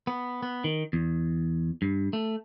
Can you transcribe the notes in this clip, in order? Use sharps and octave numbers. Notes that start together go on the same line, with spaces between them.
B3
B3
D#3
E2
G2
A3